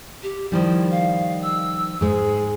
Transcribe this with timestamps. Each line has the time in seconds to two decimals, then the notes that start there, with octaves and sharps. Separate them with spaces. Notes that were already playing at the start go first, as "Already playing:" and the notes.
0.23 G4
0.52 D#3 F3 G3 E4
0.91 F5
1.43 E6
2.01 G#2 G#3 G#4